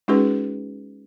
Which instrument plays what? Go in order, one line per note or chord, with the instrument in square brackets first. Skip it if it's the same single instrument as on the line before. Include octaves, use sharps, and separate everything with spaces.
[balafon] G#3 C#4 D#4 F#4 G#4 B4